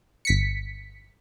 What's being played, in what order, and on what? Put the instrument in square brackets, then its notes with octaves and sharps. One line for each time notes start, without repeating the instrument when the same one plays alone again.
[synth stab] G1 B6 C#7